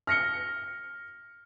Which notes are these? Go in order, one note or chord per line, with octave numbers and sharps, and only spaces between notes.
F6 A#6 C#7 G7